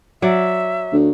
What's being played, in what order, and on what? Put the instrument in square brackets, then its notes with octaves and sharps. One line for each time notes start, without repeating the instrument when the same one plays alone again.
[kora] F#3 D5 [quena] E5
[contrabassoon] D2